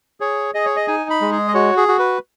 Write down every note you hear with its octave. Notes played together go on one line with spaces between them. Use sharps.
G#4 C#5
G#4 D#5
C#5
D#5
D#4 G#5
B5
G#3
G#4
D#5
F#4 C#5
G#4
F#4
B4